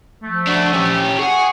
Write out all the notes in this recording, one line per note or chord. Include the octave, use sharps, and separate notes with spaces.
F3 A3
D4 F#4
C#4 G4
G#4 F#5 G#5 C#6